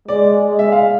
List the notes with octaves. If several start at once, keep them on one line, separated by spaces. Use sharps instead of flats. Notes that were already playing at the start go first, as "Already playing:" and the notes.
G#3 D5
G#3
E5
F5